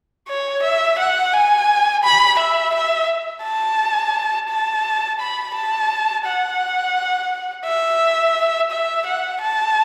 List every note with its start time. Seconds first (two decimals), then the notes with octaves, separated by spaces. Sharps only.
0.28 C#5
0.63 E5
0.99 F#5
1.34 G#5
2.04 B5
2.39 E5
2.74 E5
3.44 A5
4.49 A5
5.20 B5
5.55 A5
6.25 F#5
7.66 E5
8.71 E5
9.06 F#5
9.42 A5